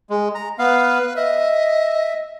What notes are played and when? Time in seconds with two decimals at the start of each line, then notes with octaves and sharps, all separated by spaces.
0.10 G#3
0.35 A#5
0.59 B3 B4 F5
1.16 D#5 E5